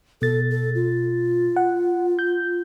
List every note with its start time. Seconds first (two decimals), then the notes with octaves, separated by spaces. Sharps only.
0.22 B2 A4 A6
0.50 A4
0.75 F4
1.56 F#5
2.19 G6